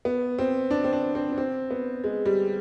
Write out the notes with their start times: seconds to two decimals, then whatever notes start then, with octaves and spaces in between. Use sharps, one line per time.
0.05 B3
0.39 C4
0.71 D4
0.84 C4
0.93 D4
1.15 C4
1.33 D4
1.38 C4
1.71 B3
2.04 G#3
2.26 G3